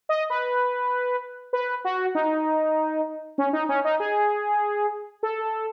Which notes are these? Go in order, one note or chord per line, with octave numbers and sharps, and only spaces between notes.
D#5
B4
B4
F#4
D#4
C#4
D#4
C#4
D#4
G#4
A4